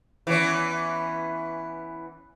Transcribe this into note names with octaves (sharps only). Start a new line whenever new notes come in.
E3 B3 C#4